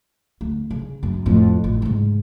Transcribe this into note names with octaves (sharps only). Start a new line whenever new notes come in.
D2
C#3
F#2
F2 A2
A1
G#2 C#3